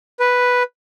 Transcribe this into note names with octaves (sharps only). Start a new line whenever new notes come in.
B4